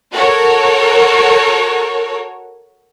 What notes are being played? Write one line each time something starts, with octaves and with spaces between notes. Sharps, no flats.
F#4 A4 A#4 C#5